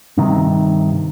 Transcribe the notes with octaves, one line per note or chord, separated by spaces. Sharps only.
G2 C3 D#3